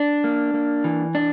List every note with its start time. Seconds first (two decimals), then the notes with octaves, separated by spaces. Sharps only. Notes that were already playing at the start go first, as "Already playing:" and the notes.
Already playing: D4
0.24 A#3
0.54 A#3
0.84 E3
1.15 D4